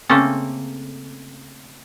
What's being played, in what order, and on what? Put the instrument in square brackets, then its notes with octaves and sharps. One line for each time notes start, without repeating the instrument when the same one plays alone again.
[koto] C#3 A3 A#3 C4 C#4 A4